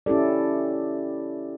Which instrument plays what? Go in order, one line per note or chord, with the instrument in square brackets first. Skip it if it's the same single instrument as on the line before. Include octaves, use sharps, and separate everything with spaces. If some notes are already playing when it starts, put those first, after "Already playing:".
[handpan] C#4 E4 G4 A4 D5